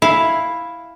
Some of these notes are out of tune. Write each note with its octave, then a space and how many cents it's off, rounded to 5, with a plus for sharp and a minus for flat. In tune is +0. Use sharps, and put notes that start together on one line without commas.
E4 +0 F5 +0 G#5 +0